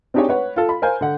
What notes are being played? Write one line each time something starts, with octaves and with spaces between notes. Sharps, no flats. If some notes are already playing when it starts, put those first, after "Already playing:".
C4 D4 D#4 G4 G#4 C#5
B4 C#5 F#5
F4 A4
B5
A#4 C5 F5 G#5 G6
D3 F#5